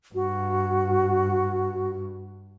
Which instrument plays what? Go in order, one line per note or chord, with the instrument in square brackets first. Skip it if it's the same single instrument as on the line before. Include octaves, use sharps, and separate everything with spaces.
[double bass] G2 [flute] F#4